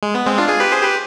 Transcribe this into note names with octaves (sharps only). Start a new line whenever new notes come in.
G#3
B3
G#3 C4
D4 F4
F4 G#4
G4 B4
G#4 C5
G4 B4